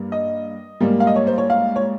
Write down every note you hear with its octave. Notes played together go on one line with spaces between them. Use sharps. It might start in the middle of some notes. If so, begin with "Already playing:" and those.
Already playing: G2 G3 A#3
D#5
G#2 G3 A#3
F5
D#5
C#5
C5
C#5
F5
C#5